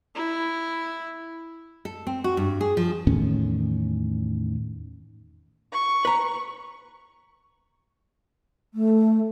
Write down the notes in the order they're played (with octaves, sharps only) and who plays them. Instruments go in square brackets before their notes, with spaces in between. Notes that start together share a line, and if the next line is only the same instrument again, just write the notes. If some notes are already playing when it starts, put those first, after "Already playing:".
[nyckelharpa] E4
[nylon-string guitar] A4
C4
F#4
G2
G#4
F3
[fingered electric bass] E2 A2 D#3 C#4
[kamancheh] C#6
[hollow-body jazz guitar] B4 A#5
[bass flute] A3